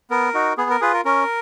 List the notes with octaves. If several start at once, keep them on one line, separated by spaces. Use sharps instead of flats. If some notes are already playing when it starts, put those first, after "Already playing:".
B3 A#4
D#4 F#4
B3 G#4
A#4
F4 G#4 B4
A#4
C#4 A#4